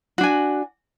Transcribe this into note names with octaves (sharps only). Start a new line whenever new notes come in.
D4 F#4 G#5